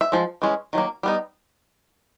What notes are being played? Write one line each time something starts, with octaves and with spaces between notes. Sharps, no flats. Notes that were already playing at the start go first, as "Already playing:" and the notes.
E5
F3 G#3
E3 G#3 C#4
D#3 F#3 A#3
G3 B3 D#4